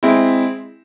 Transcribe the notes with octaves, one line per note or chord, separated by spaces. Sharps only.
G#3 C4 E4